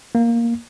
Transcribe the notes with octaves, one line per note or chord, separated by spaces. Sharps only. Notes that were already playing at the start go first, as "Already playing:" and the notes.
A#3